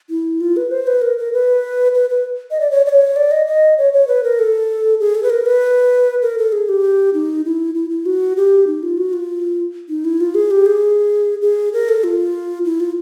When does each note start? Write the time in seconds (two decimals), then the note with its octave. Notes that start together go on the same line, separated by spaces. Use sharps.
0.10 E4
0.41 F4
0.57 B4
0.71 C5
0.87 B4
1.02 A#4
1.18 A#4
1.33 B4
1.95 B4
2.10 B4
2.51 D#5
2.60 D5
2.71 C#5
2.86 D5
2.89 C#5
3.16 D5
3.31 D#5
3.47 D#5
3.78 C#5
3.93 C#5
4.08 B4
4.23 A#4
4.39 A4
5.00 G#4
5.15 A4
5.23 B4
5.30 A#4
5.46 B4
6.22 A#4
6.38 A4
6.52 G#4
6.69 G4
7.14 D#4
7.45 E4
7.75 E4
7.90 E4
8.06 F#4
8.37 G4
8.67 D#4
8.83 F4
8.98 F#4
9.13 F4
9.89 D#4
10.05 E4
10.20 F4
10.35 G#4
10.51 G4
10.66 G#4
11.42 G#4
11.73 A#4
11.89 A4
12.04 F4
12.65 E4
12.80 F4